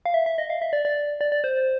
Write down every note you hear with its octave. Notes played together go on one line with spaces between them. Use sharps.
F5
E5
E5
D#5
F5
E5
D5
D5
D5
D5
C5